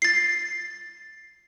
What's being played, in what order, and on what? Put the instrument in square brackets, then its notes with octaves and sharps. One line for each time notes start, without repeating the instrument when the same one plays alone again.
[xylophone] A6 C7